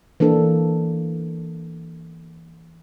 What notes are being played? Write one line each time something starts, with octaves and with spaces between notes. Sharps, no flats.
E3 A#3 D4 A4